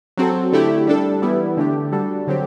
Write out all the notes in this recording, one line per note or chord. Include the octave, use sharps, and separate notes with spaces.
F#3 C4 F#4 A4
D3 A3 E4 G4
G3 D4 A4
E3 G3 B3 E4
D3 A3 D4 G4
G3 D4 F#4 A4
D3 F#3 C4 G4